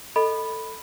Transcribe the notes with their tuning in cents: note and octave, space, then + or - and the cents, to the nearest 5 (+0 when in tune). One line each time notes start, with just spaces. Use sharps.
A4 +15 D#5 +0 B5 +0